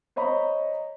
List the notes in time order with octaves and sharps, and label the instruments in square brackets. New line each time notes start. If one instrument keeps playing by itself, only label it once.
[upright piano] C5 C#5 D#5 A#5 B5